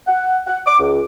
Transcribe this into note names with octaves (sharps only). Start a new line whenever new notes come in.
F#5
F#5
D6
C#2